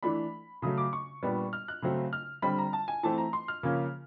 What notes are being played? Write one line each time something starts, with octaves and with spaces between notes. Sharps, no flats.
E3 A3 D4 B5
C#3 F#3 A3 D#6
D6
C#6
A#2 G3 B3 D4
F6
F#6
C#3 F#3 A3 C4
F6
D3 G3 C4 B5
A#5
A5
G#5
E3 A3 C4 A5
A#5
C6
F6
C#3 F3 A#3 C#4